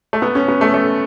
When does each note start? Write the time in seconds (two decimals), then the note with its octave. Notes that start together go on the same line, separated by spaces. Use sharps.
0.13 A3
0.22 B3
0.35 C#4
0.48 B3
0.61 A3
0.74 A3